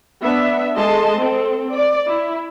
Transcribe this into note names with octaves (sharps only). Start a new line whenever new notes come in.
B3 D4 E5
G#3 A4 D#5 A5 C6
C4 A4
D5
E4